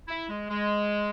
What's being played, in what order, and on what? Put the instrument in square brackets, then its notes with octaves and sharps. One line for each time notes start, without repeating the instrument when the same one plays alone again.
[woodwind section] E4
G#3
G#3